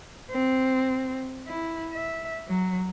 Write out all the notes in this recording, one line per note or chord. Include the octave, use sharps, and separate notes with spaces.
C4
E4
E5
F#3